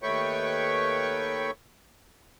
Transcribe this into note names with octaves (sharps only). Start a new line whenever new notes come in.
D#2 A3 B4 C#5 G5 C#6